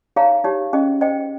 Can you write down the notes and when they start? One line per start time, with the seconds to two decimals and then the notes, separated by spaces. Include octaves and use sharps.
0.16 D#4 G#4 C#5 F5 A#5
0.44 D#4 G4 C#5
0.73 C#4 G#4 D#5
1.01 C5 D#5 G5